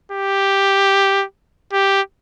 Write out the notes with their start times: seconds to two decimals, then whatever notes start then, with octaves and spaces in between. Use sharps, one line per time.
0.12 G4
1.73 G4